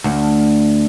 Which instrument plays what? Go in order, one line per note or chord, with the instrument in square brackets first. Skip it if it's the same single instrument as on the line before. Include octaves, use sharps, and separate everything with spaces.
[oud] D2